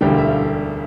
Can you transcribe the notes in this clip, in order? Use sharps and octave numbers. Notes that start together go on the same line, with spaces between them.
E1 D2 D3 G3 G5
F5
E5
F5